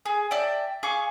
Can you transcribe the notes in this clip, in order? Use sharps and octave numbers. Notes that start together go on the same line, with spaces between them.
G#4
D5 E5 G5 A5
G#4 F5 C#6 D6